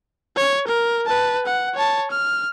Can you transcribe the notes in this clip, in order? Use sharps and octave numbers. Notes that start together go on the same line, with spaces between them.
C#5
A#4
B4 A5
F#5
C#5 A5
F6